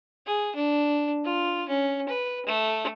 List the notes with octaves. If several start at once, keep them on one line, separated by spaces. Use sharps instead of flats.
G#4
D4
F4
C#4
B4
A3